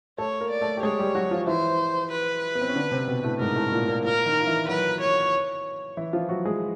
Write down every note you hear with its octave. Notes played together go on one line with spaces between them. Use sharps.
A3 A4 C#5
A#3 A#4
D5
A3 A4
G4
G#3 G#4 C#5
G3 G4
F#3 F#4
F3 F4
E3 E4 C5
B4
B3
C4
C#4
D3 D4
C3 C4
B2 B3
A2 A3
G#2 G#3 A#4
A2 A3
A#2 A#3
A#2 A#3
A#2 A#3 A#4
D#3 D#4
F4
E3 E4
F#3 F#4 B4
C#5
E3 E4
F3 F4
F#3 F#4
G#3 G#4